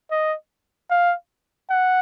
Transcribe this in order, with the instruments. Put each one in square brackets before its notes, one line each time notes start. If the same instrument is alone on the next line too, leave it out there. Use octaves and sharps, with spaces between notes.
[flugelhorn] D#5
F5
F#5